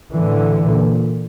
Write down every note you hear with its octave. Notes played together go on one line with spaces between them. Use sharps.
A2 D3 E3
A#2